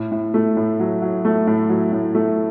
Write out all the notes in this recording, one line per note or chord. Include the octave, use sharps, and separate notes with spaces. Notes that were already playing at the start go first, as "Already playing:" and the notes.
Already playing: A2
A2
A3
A2
F#3
F#3
A3
A2
F#3
A2
A3